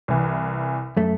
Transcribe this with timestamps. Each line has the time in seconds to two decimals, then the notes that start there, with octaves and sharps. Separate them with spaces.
0.08 C2 E3
0.97 F#2 A3